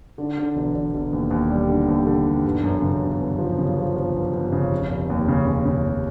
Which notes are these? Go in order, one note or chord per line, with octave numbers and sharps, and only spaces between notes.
D3
D3
E1
E1
E1
D#2
D#2
G3
D3
D#2
D3
E1
G1
F#2
C#3
F#2
G1
F3
C#3
F3
F3
G1
G1
C#3
F1
F1
D#2
C#3
C#3
C#3
F1